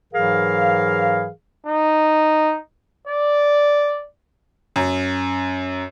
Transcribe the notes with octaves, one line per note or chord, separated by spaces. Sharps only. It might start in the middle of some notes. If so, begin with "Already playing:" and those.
G#2 E3 F#3 G#4 A#4 F5
D#4
D5
F#2